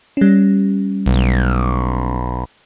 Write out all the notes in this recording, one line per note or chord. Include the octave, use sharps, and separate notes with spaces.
G3 C#4
B1